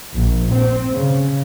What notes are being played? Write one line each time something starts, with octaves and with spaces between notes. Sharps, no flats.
A#1
C4
C#3